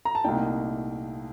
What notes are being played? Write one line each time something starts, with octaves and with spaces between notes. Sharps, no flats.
A#5
A5
C2 A#2 A3 D#4 G5